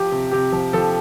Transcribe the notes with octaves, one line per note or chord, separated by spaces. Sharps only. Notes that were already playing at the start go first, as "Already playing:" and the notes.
Already playing: F3 G4
C3
C3 G4
F3
F3 A4